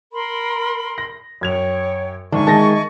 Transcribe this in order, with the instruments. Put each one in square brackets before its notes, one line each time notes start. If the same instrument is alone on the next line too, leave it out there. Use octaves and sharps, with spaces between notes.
[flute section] A#4 B5 C6
[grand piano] A#6
[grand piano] F#2 G#6 F7 [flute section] C#5 G5
[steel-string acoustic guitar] G#2 [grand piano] D3 D#3 D4 [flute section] E5 G#5 C#6
[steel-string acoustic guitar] D#3 G#3 [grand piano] A5 A6 A#6